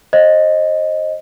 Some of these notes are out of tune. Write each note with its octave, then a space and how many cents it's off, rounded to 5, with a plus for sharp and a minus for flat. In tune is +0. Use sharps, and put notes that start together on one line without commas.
C5 +25 D#5 +0